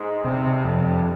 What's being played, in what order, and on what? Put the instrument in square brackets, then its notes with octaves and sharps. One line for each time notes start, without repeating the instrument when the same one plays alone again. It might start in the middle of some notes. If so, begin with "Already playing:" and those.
Already playing: [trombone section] G#2 G#3
[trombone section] G2 G3 [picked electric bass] C3
[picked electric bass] F2